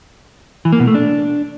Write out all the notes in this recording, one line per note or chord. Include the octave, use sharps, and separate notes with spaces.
E3
A#3
B2
A3
D4